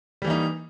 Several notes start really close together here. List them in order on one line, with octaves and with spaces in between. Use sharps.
G3 E3 A#3 D#4